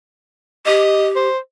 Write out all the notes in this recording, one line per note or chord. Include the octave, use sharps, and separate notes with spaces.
G4 D#5
C5